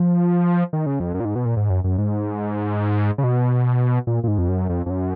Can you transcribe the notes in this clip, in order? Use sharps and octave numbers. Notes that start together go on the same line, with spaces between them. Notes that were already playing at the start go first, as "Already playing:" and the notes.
Already playing: F3
D#3
C#3
F2
F#2
A#2
G#2
B2
A#2
G#2
F#2
F#2
G#2
C#3
B2
A#2
A#2
G#2
F2
F#2
F2
F2
F#2